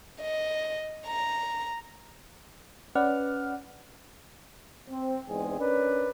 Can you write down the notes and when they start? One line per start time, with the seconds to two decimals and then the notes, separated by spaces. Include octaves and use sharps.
0.21 D#5
1.07 A#5
2.95 C#4 B4 D5 F#5 F6
4.89 C4
5.29 E2 G#2 G#3 C4 G#4 G#5
5.60 C#4 D4 A#4 B4 D5